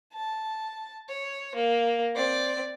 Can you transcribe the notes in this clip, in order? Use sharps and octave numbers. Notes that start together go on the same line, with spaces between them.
A5
C#5
A#3
C4 D5